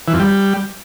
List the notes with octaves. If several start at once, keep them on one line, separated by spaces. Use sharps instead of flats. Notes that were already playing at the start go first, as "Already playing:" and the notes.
E3
F2
G3